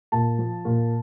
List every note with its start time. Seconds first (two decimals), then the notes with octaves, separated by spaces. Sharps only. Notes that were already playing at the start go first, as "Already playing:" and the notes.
0.12 A#2 A5
0.39 F3
0.65 A#2